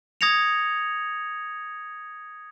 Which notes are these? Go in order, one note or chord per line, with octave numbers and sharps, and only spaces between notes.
D#6 G#6 A#6 C#7 F7